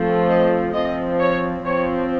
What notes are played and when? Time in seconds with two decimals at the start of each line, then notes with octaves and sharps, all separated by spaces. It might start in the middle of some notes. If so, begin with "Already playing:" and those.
Already playing: F3 A3 C4
0.28 D#5
0.74 F3 C4 D#5
1.20 C#5
1.64 F3 C4 C#5